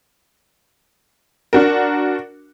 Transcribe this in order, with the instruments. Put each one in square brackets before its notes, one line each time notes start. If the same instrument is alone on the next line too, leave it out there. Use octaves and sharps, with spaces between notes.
[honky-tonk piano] D4 F#4 A#4